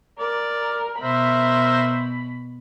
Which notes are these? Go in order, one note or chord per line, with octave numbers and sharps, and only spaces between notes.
A#4 D5
B2 A#4 C5 E5 B5